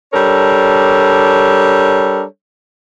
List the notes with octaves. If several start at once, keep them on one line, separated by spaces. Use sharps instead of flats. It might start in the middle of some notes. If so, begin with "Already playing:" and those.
G3 D4 A4 A#4 C#5